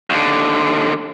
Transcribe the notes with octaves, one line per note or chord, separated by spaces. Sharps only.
D#2 D3